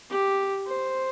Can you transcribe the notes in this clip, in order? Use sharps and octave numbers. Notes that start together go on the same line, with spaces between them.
G4
C5